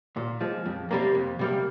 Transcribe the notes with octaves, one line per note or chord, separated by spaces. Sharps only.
A#2
F3 G#3
F2
C3 G3 A#3
F2
C3 G3 A#3